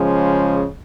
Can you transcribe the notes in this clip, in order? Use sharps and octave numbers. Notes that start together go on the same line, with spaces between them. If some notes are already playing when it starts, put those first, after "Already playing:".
Already playing: C#3 F3 G#3